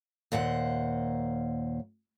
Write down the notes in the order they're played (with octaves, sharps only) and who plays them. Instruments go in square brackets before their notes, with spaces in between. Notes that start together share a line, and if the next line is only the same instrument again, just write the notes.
[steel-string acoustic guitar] D#2 A#2 C5 F#5